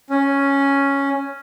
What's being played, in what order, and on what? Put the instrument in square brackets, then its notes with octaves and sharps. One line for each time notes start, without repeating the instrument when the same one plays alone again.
[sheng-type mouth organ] C#4